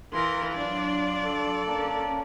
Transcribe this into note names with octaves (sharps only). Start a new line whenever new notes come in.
E3 F4 A#4 C6
F#3 D4 D5
A4
A#3 C#4 D4